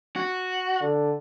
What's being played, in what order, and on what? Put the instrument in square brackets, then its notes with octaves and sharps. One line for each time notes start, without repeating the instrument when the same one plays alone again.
[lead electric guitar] F#4
[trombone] D3